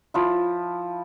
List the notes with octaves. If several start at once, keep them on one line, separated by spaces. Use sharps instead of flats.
F3 E4